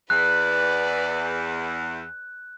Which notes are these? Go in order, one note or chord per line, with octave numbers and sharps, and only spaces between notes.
E2 B4 D5 F#6